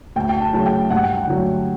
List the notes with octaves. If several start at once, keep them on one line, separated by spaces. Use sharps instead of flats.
D2 G5
G5
A5
C#3 F#3 A3 A5
G5
G2 F#5
G5
F#5
D3 F#3 A3